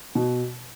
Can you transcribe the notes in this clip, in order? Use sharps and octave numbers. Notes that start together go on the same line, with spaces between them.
B2